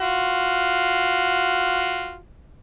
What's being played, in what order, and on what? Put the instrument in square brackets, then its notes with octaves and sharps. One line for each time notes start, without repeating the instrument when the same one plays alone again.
[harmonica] F4 F#4